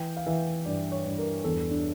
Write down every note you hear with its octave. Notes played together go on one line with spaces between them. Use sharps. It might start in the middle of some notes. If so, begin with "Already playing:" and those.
Already playing: E3 G5
F5
E3 E5
G2 D5
C#5
G2
A#4
E2 A4
D4